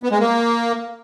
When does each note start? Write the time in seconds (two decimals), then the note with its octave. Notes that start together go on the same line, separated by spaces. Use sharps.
0.03 B3
0.11 G#3
0.20 A#3